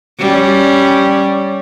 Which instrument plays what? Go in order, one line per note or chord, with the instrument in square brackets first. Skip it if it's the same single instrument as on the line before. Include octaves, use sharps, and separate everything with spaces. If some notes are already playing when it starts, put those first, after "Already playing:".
[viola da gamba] G3 C#4